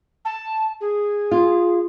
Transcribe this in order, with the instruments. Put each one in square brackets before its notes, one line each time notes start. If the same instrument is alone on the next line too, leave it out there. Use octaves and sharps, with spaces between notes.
[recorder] A5
G#4
[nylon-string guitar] F4